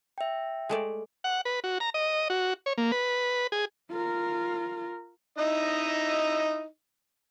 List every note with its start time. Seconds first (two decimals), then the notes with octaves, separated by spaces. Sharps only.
0.18 E5 G5
0.69 G#3 A3 D5
1.24 F#5
1.45 B4
1.64 F#4
1.80 A#5
1.94 D#5
2.30 F#4
2.66 C#5
2.78 A#3
2.92 B4
3.52 G#4
3.91 F4 A#4
5.38 D#4 E4 D#5